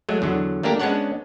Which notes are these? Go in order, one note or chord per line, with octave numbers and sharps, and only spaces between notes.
F#3 G#3 A3
E2 D3 F#3
A3 A#3 D4 G4 A#4
G#3 B3 C#4 D4 C#5 F#5